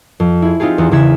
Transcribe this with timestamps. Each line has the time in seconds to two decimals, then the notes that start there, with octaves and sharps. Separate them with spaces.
0.20 F2
0.42 E4 G#4
0.60 C4 D#4 F4 G4 G#4
0.78 E2
0.91 E2 C#3 E4 G#6 B6 E7